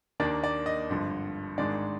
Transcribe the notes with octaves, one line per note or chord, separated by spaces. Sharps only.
D#2 D#3 A#3 D4 D5
D5
D#5
G#1 G2 D3 F3
G#1 G#2 D#3 G#3 D4 D5